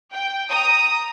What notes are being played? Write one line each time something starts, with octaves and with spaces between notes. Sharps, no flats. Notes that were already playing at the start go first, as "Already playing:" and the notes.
G5
A#5 D#6